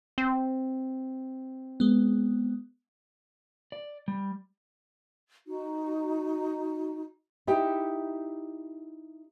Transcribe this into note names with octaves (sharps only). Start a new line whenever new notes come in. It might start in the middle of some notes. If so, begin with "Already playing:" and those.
C4
G#3 B3
D5
G3
D#4 F#4
D#4 E4 G4